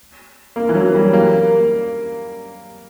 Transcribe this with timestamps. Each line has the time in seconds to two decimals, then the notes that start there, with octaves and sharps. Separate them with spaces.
0.56 A#3
0.69 E3
0.75 F#3
0.95 G3
1.13 A#3